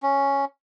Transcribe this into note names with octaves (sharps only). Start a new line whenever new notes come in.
C#4